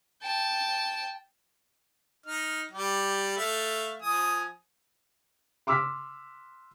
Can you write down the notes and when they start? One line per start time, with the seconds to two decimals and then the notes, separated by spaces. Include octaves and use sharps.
0.22 G5 A5
2.26 D#4 F6
2.71 G3 G4
3.37 A3 E5 F5
4.02 F3 G#5 D#6
5.67 C6 D6 E6 F6 B6